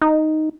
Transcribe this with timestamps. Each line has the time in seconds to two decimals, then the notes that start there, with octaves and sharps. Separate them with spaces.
0.02 D#4